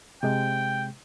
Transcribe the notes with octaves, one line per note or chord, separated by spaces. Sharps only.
C3 G#3 G5